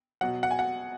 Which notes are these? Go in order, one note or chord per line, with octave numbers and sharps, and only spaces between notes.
B2 F#3 F#5
F#5
G#5
F#5